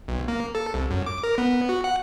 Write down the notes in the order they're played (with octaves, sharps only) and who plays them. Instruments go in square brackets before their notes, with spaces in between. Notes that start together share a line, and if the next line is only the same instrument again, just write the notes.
[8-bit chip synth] B1
A#3
A4
C2
F#2
D6
A#4
B3
B3
F#4
F#5